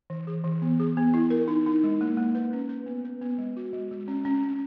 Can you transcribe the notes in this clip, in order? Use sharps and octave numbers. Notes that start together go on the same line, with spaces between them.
E3
G#4
E3
B3
G#4
B3
E4
A#4
D#4
D#4
G#3
A#3
A#3
B4
C#4
B4
B3
B4
B3
G#3
F#4
G#3
G#3
C#4
C#4
C#4